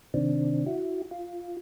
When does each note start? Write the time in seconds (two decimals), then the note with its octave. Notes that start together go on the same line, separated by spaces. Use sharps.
0.14 C3 D#3 C4 D4
0.66 E4 F#4
1.11 F4